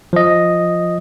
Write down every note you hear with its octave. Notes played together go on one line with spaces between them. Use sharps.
F3 D#5